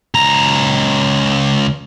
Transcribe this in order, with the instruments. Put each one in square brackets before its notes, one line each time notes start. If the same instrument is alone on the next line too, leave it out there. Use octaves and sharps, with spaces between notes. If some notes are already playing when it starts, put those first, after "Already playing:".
[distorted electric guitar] C#2 A#5